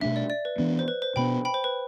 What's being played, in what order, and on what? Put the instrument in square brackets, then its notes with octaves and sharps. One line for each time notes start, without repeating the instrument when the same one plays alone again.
[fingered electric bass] B2 A3 D4 [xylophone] E5
[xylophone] D5
D5
B4
[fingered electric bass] E3 B3 D4
[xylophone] C5
B4
C5
[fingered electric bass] B2 B3 D4 [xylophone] G5 B5
[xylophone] G5 B5
C5
B4